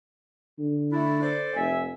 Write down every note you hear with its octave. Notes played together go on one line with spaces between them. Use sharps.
D3
A3 D4 E4
A4 C5 D5
F1 E5 G#5